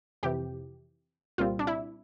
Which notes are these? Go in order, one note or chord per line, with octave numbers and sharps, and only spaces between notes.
F2 C3 E3 G4
C2 A#2 G3 C4 F4
D4
E4